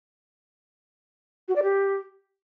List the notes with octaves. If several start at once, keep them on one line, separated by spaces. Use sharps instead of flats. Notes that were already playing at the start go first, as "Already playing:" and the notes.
F#4
D5
G4